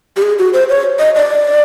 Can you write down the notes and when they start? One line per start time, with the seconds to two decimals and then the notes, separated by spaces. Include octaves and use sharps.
0.16 G4
0.22 G#4
0.39 F#4
0.53 C5
0.69 C#5
0.99 D#5
1.16 D5